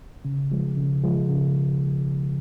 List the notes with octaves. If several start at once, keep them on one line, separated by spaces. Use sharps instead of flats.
C#3
F3 G#3
C#3
F3 G#3
C#3